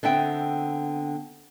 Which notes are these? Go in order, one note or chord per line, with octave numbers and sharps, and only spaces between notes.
D3 B3 C4 E5 G5